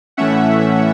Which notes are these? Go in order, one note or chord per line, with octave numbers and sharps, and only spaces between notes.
A2 E3 A3 C#4 E5 F#5